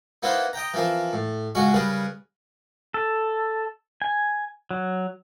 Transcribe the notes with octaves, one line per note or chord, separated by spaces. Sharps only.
A#3 B3 D#4 E4 B4 C5
D#5 G5 A#5
E3 F3 C4 A#4
A2
A#1 C#3 G#3 C#4 F#4 C#6
C#3 G3 G#4 A#4 B4
A4
G#5
F#3